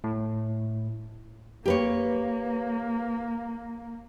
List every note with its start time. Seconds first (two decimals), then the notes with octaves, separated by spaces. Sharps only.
0.04 A2
1.66 A#3 G4 B4 C#5